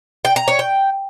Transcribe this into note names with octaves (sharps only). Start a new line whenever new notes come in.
G5
A#5
C#5
G5